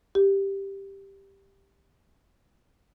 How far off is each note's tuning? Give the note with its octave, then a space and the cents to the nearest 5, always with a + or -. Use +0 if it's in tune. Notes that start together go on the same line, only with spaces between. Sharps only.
G4 +5